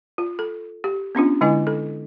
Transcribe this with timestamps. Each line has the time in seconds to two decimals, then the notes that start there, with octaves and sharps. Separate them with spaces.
0.18 F4
0.39 A4
0.84 G4
1.15 B3 C#4 D4 F4
1.41 D3 G#3 E4 D#5 G#5
1.67 A4